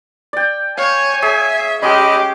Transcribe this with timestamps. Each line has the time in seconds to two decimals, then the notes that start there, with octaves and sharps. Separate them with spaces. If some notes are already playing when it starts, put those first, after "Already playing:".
0.33 D5 G5
0.78 C#5 F5 G#5
1.22 G#4 C#5 E5
1.82 G#3 C#4 G4 D#5 B5 D6